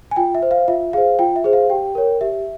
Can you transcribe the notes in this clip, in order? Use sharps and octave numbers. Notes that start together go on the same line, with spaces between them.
G#5
F4 G5
E5
C5
F5
F4 E5
G#4 C5 F5
F4 G5
E5
G#4 C5
F5
G4 G5
A#4 C#5
G4 E5